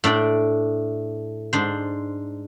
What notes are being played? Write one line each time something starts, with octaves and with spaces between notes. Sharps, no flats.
A2 D4 D5 G5
G#2 D4 C5